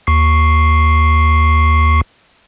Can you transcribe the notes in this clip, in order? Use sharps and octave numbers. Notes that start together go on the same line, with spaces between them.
D#2 C#6 C7